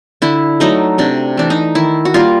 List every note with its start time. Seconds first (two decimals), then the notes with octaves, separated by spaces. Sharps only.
0.22 D3 E4
0.60 F#3 A3 D#4
0.98 C3 D4
1.37 E3 A3 D4
1.50 D#4
1.75 D#3 E4
2.05 F#4
2.14 G3 A#3 F4